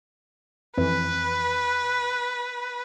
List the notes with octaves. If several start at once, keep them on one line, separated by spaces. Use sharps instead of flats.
F2 E3 B4